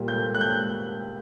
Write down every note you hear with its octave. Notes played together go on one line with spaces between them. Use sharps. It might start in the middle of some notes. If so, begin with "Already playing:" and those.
Already playing: A#2 G3 A#3
G6
F#6
G6